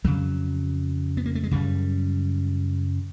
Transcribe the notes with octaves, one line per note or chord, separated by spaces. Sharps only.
F2 C#3 F#3
B3
A#3
A3
G#3
F#2 C#3 G3